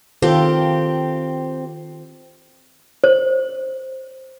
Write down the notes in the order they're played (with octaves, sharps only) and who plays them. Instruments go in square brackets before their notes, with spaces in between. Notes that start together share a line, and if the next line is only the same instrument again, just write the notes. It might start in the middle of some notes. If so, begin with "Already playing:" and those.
[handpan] D#3 F4 A4 [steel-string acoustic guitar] C4 G4
[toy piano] C5